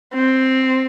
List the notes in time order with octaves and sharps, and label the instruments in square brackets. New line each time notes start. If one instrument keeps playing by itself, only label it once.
[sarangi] C4